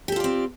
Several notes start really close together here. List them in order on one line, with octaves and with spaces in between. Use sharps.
G4 A4 F4 D5 C4